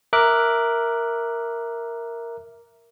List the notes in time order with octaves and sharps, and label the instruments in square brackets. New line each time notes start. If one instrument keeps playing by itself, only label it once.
[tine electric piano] A#4 E5 D6 F#6